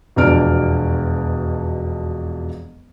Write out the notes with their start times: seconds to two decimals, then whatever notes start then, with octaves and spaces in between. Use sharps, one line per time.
0.16 E1 F2 B2 D4 F6 D7